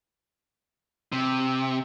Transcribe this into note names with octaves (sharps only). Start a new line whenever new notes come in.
C3